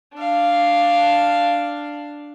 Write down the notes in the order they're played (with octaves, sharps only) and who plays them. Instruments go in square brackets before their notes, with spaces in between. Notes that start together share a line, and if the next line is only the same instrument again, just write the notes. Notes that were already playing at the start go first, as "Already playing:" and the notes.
[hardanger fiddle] D4 F5